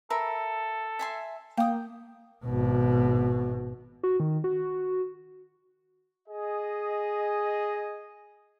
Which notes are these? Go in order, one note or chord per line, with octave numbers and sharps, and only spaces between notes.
A4 A#4 E5 B5
E5 G#5 C6
A#3 G5 D#6
G#1 B2
F#4
D#3
F#4
G#4 D#5